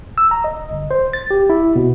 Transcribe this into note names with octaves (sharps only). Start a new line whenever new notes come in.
E6
A#5
D#5
G1
C5
A6
G4
E4
B2